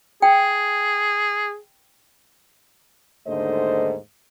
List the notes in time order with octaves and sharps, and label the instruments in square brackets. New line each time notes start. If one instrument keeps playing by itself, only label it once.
[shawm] G#4 [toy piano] G5
[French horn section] D#2 G#2 D3 A3 C5 D#5